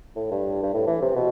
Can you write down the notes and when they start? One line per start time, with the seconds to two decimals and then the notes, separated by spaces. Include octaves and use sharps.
0.16 A2
0.31 G2
0.63 G2
0.74 A2
0.87 E3
1.02 C3
1.15 B2